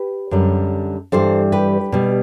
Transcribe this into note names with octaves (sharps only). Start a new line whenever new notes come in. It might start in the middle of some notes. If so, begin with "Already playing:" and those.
Already playing: G4 B4
F#2 D3 G3
G2 E3 G3 A4 C5
G4 B4
B2 G3